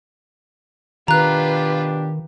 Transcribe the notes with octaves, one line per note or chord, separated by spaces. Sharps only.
B2 D#3 D4 F4 G4 B4 A#5 F#6